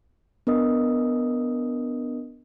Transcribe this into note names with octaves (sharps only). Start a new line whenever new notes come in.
B3 D4 A#4 D#5 D#6